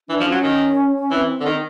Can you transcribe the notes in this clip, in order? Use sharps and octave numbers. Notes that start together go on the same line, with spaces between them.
E3 D4
F3
C#4
F#3
D#3
E3 C4
D3
D#3